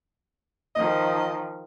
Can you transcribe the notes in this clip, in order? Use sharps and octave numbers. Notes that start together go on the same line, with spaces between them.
D#3 F3 D#5